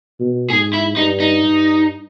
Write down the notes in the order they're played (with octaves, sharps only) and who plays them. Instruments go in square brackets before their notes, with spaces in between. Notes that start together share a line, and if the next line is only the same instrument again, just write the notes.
[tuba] B2
[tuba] G#2 [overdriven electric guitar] G#4
[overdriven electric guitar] E4
[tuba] G2 [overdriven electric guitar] D#4
[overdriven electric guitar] D#4
[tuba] G2